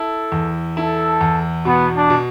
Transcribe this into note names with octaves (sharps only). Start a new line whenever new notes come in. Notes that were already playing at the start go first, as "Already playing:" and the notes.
Already playing: E4 A4
E2
E4 A4
E2
B2 B3
D4
B2